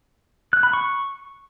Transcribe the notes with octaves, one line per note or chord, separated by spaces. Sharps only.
F#6
B5
C#6